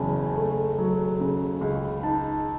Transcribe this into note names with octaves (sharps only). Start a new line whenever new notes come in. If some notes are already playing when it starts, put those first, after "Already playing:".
Already playing: F#1 E2 C#3 G#5 A5
A3
F#3
C#3
C#2
D#4 A5